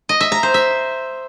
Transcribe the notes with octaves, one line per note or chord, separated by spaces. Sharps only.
D#5
E5
A#5
C5
E5